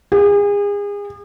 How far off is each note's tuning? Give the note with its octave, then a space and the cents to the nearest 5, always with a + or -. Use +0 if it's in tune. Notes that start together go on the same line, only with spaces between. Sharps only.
G#4 -35